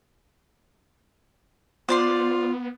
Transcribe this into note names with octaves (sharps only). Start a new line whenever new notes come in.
B3 F4 C5 D5 C6